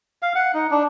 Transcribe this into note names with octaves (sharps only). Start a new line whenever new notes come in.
F5
F#5
D#4
D4